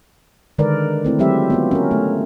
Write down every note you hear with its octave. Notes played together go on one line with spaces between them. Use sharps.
D3 D#3 G#3 A#4 B4 D5
A3 C4 E4
F#3 G#3 C4 G4 E5
B3 F4 F#4
C#4 A#4
A3